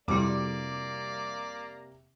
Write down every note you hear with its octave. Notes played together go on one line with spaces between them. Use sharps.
F2 C3 G3 A#3 E4 F#4 D5 D6